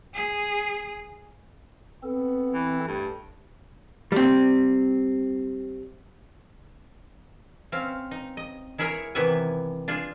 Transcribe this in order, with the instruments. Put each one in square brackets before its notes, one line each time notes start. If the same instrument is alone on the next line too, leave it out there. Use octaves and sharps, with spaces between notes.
[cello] G#4
[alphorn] B3 [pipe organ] C4 A4
[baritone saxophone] E3
[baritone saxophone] G2 [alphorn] A3
[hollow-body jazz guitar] G3 C4
[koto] C4 C#4 F5
D#4
D#5
G#3 E4 G#4 A#4 C#5
C3 D#3 E3 B3 E4 G#5
D4 F4 G#4